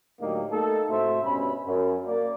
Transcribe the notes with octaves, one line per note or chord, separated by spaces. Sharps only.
A2 D3 F#3 A#3 D#4 G4
A3 A#3 D#4 A4
A2 C3 F#4 C5 E5
G2 B2 C#4 B5
F#2
A#3 D5